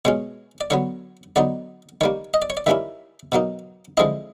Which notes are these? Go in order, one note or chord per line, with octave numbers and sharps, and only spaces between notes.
B2 G#3 C#4 C#5
D5
D3 F#3 B3 C#5
D3 F#3 B3 D#4 D5
D#3 G3 A#3 C#5
D#5
D5
C#5
D5
D#3 G3 A#3 C#4 E4 E5
B2 F#3 A#3 D#4
D3 F3 G#3 C4 E4 D#5